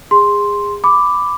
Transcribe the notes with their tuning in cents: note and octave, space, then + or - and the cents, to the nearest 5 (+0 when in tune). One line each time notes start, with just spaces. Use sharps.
G#4 -25 C6 +0
B5 +10 D6 +0